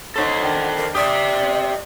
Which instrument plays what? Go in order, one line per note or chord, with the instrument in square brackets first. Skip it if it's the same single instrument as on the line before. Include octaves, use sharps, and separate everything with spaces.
[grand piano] D#4 C#5 [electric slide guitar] A4 C5 [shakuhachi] F#5
[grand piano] D#3 D4
[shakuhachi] A#4
[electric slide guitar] G4 E5 [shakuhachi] D5 [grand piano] D#6